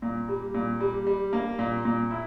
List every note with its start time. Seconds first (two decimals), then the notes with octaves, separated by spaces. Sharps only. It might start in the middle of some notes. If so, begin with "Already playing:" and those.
0.02 A#2
0.28 G3
0.54 A#2
0.80 G3
1.07 G3
1.33 A#3
1.59 A#2
1.85 A#2
2.11 E4